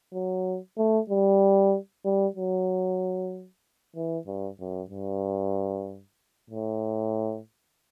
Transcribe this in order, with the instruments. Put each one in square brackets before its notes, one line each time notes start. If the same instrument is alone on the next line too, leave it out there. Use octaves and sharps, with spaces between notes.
[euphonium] F#3
A3
G3
G3
F#3
E3
G2
F#2
G2
A2